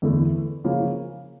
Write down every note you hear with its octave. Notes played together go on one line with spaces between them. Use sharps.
E2 D3 A3 E4
C#3 F3 A#3 C#4